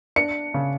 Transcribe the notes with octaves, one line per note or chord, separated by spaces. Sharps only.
D4 C#7
C#3